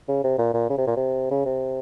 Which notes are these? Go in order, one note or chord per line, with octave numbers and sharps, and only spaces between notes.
C#3
C3
A#2
A#2
C#3
C3
A#2
C3
C#3
C3